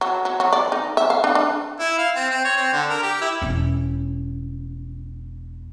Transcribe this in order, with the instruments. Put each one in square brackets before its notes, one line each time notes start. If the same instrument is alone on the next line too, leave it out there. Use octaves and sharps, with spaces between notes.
[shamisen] F#3
F#3
F#3
D5
D#4
E5
F5
D4
D4
[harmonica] E4
F5
C4
C4
C#5
C4
D3
A#4
G4
E4
[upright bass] E1 C#4